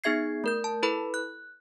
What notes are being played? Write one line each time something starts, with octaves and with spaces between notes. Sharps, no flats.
B3 D#4 G#4 E5 G#6 C7
A3 A#4 G6
A5
E4 A4 B4 B5
F#6